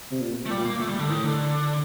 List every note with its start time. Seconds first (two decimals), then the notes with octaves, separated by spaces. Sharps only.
0.11 C3
0.21 A#2
0.46 A3
0.50 A#2 G3
0.65 A#3
0.80 A3
0.89 G3
0.99 D3
1.09 A2 D#3
1.24 D3